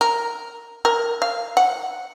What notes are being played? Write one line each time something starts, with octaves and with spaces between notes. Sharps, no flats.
A#4
A#4
F5
F#5